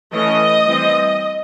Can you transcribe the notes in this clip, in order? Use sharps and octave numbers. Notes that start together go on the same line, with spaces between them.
E3 A3 C#4 D#5
E3 G3 C4